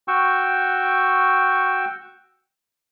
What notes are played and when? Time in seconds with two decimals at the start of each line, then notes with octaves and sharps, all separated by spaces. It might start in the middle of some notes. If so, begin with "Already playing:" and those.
0.08 F#4 G5 C#6 E6